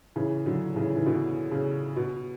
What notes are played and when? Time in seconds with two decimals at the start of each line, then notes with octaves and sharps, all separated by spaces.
0.16 C#3 E3
0.46 D3 F#3
0.76 C#3 E3
0.96 E3
1.06 B2 D3
1.51 C#3
1.96 B2